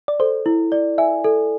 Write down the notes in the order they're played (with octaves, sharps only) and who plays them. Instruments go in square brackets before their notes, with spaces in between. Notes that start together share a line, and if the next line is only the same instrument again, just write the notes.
[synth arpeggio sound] D5
[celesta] A4 [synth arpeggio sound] C5
[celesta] E4
D5
[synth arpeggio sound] E5 [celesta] G#5
[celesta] A4